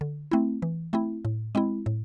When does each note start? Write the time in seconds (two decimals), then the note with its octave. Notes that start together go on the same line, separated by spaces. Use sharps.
0.01 D3
0.31 A3 C4 E4
0.62 E3
0.93 A3 C4 E4
1.25 A2
1.55 G#3 C4 E4
1.86 A2